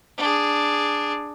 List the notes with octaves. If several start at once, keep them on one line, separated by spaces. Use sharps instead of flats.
D4 G#4